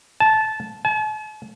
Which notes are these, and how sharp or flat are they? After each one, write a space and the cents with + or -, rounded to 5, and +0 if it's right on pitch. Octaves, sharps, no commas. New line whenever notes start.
A5 -15
A5 -45